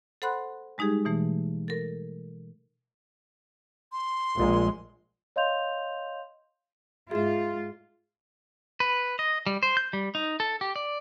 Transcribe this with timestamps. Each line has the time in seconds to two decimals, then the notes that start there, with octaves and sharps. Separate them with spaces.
0.22 A4 C5 F#5 B5 C6 F#6
0.78 G3 G#3 D#4 G4 G#4
1.05 B2 E3 A3
1.68 A4 A#4
3.92 C6
4.38 A#1 A#2 G#3
5.36 C#5 D#5 F5 C6 G6 F7
7.11 G#2 F4 G#4 E5
8.80 B4
9.19 D#5
9.47 G3
9.63 C5
9.77 G6
9.93 G3
10.15 D#4
10.40 A4
10.61 G4
10.76 D5